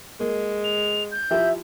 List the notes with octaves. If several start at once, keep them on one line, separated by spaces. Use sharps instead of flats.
G#3 A#3
F7
G6
F3 E4 G4 E5